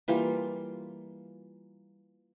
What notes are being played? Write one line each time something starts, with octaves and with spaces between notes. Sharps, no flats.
E3 G3 A#3 F4